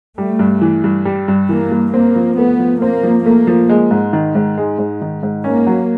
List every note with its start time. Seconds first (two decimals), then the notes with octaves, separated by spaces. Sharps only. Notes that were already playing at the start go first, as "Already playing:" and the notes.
0.18 G3 A3
0.39 G2
0.61 E3
0.84 G2
1.05 G3
1.28 G2
1.49 E3 A#3
1.71 G2
1.93 A#3 C4
2.16 F3
2.38 A3 B3
2.59 F3
2.81 A#3 C4
3.03 F3
3.25 A3 A#3
3.47 F3
3.69 G#3
3.91 G#2
4.13 D#3
4.35 G#2
4.58 G#3
4.78 G#2
5.01 D#3
5.23 G#2
5.44 A#3 C#4
5.67 F#3